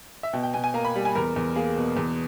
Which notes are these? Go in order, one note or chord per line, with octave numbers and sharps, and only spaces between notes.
E5
B2 G5
G5
B2 G#5
G#5
A#3 A#5
B5
G3
G#5
E2 A#4
E2
A#3 G#4
B2
E2